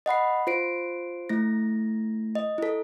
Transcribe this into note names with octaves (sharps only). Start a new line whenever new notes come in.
D#5 F#5 B5 C7
F4 C5 C7 D7
A3 E4 A#6
D#5
E4 A4